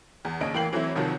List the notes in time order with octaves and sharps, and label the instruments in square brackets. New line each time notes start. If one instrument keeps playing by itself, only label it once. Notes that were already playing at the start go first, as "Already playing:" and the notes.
[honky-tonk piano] E2
A#1 D#2 C#3 C#4 D#5 D7
A1 E3 A#3 G5 C7 F#7
E3 F#3 A3 C4 E4
C2 C3 D#3 F3 F#3